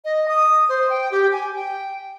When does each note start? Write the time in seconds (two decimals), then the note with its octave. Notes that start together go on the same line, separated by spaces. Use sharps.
0.05 D#5
0.28 D#6
0.69 C5
0.90 G5
1.12 G4
1.32 G#5
1.56 G5